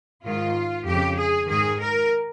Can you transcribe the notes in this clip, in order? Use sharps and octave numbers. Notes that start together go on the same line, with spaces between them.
G#2 D#3 F4
F2 C#3 G4
G#4
G#2 D#3 G#4
A#4